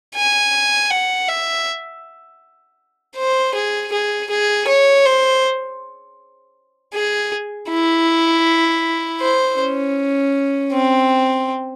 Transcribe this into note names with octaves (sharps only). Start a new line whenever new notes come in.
G#5
F#5
E5
C5
G#4
G#4
G#4
C#5
C5
G#4
E4
C5
C#4
C4